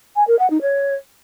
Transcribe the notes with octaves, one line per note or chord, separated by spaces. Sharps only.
G#5
A#4
F#5
D#4
C#5